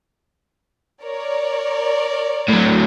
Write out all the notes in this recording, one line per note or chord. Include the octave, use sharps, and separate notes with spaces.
A#4 C#5 D5
A2 F#3